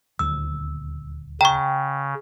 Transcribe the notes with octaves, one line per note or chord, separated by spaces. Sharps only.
D#1 D2 E6
C#3 G5 A#5 C#6